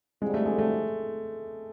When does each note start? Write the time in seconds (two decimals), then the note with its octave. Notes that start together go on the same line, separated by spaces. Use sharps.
0.22 F2 D3 G3 G#3
0.34 A3
0.46 G#3
0.58 A3